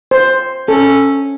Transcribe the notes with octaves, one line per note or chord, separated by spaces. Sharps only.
C5
C#4 A4